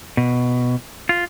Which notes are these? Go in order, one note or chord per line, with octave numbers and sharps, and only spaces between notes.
B2
F4